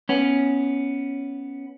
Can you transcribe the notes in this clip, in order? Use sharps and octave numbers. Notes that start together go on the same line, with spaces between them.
B3 C#4